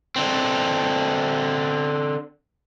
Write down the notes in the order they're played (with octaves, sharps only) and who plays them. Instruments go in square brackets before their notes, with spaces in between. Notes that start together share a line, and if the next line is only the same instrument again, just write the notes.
[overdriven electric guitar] D3 C4